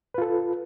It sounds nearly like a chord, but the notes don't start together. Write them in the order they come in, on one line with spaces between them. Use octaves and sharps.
B4 F4 A4